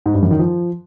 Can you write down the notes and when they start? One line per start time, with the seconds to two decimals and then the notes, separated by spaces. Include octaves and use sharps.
0.06 G#2
0.14 G2
0.22 F#2
0.31 D#3
0.39 F3